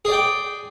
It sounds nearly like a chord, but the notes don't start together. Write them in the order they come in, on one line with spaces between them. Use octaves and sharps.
G#4 D5 G5